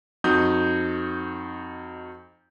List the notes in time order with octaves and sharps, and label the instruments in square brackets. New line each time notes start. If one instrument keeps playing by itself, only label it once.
[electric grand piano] F2 D#4 F#4 D#6 G6